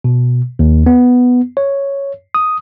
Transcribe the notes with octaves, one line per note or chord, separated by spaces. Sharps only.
B2
D#2
B3
C#5
D#6